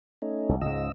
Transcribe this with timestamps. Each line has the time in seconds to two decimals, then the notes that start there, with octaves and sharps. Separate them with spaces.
0.22 A3 C#4 D#4
0.49 C2
0.61 C#2 G#2 C#3 D#5 E6